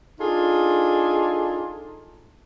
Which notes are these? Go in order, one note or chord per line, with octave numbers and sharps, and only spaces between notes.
D4 D#4 F4 G#4 A4